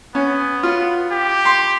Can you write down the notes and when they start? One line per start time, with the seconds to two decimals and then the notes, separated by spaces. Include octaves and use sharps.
0.15 B3 C#4
0.63 F4
1.11 G4
1.45 C6